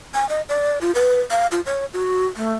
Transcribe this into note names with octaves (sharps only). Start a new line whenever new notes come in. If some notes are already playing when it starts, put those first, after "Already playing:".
G#5
D#5
D5
F4
B4
F5
F4
C#5
F#4
A3